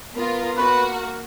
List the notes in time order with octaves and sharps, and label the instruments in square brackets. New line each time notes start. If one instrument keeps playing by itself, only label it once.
[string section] B3 F4 A#4
[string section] A#3 F#4 [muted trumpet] B4
[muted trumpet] A#4